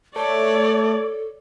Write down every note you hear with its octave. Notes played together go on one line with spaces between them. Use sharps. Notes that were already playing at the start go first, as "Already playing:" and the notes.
A3 A4 C#5 D5